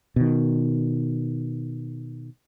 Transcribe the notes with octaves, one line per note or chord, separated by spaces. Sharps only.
B2 D#3